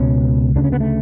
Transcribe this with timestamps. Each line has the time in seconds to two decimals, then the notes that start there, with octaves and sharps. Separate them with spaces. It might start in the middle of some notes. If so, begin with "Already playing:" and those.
Already playing: C#2 B2 C#4
0.56 D2 C#3 D4
0.64 C#4
0.72 B3
0.80 A3